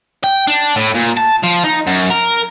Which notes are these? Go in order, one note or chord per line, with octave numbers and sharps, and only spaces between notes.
G5
D4
A2
A#2
A5
F3
D#4
F#2
A#4